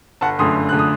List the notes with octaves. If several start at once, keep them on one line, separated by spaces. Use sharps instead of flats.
G1 F#5 A5
F#2 D3 A3 C6 D#6
G1
D3 A3 F#6
D#6